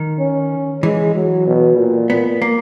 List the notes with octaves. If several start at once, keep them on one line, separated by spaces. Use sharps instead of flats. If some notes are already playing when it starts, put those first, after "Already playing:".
Already playing: D#3
C#4
E3 G#3
F#3
B2
A#2
A#2 B3
A#3